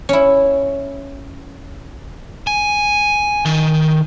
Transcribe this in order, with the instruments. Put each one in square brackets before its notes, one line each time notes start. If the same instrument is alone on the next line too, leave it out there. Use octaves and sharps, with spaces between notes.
[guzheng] C#4 E4
[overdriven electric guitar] G#5
D#3